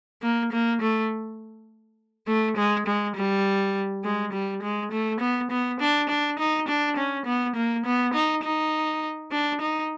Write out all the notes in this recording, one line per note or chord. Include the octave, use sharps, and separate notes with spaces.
A#3
A#3
A3
A3
G#3
G#3
G3
G#3
G3
G#3
A3
B3
B3
D4
D4
D#4
D4
C#4
B3
A#3
B3
D#4
D#4
D4
D#4